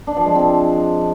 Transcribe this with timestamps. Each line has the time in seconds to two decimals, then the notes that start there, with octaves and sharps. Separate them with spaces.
0.07 D4
0.17 F3
0.26 G#3
0.35 C4